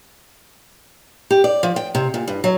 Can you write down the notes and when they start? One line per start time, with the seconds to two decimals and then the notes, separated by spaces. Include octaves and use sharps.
1.31 G4
1.44 D5
1.63 F3
1.76 G5
1.95 C3
2.14 A#2
2.28 G2
2.44 F#3